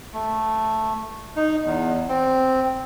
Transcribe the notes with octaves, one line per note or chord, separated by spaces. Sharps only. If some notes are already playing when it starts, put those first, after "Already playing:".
A3
D#4
E2
C4